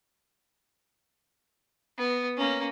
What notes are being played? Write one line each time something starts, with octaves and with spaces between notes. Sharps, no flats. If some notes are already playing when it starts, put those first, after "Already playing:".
B3
A#3 C#4